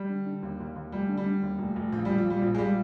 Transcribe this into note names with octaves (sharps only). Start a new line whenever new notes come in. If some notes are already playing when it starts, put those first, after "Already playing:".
Already playing: G3
D3
D3
D#2
D#2
D#2
F1 G3
D3
G3
D3
D#2
F1
F1
A#1 F3
A#1 G3
F3
A#2 G3
A#1 F3
G#3
A#2 G3